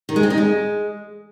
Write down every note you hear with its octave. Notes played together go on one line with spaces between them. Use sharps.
D#3
G#3
C4
D#4
G#3